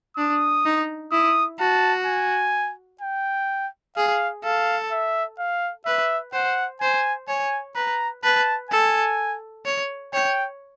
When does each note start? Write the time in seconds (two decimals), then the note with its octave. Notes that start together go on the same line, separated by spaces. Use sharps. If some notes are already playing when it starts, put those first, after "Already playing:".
0.17 D4 D#6
0.65 D#4
1.12 E4 D#6
1.59 F#4 A5
2.07 G#5
3.01 G5
3.97 G#4 F5
4.44 A4 F5
4.92 E5
5.39 F5
5.86 B4 E5
6.33 C5 F#5
6.81 C5 G#5
7.28 C#5 G#5
7.75 B4 A#5
8.24 B4 A5
8.71 A4 G#5
9.65 C#5
10.13 C#5 G5